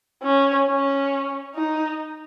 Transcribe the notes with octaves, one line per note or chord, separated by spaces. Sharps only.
C#4
C#4
D#4